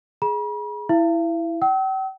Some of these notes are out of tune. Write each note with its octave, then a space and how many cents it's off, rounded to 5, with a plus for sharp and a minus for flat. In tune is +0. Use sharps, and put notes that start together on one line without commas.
G#4 +10 B5 -45
E4 +0 F5 -45
G5 -45 E6 -45